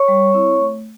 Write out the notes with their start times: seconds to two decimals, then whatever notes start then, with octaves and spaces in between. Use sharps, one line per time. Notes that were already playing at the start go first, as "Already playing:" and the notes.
Already playing: C#5 C#6
0.08 G3
0.33 C4 E4
0.58 A3